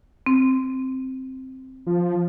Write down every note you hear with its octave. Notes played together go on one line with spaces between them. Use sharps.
C4
F3